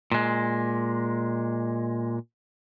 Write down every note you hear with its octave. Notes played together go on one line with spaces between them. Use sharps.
A#2 G#3